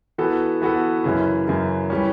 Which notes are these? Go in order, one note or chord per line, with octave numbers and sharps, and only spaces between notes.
E3 B3 F#4 A4
E3 B3 F#4 A4
F#2 C#3 E3
F#2 C#3 E3
E3 G3 C#4